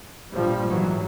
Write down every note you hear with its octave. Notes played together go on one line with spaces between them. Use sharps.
A#1 G2 F3 G3
G#2 E3 F#3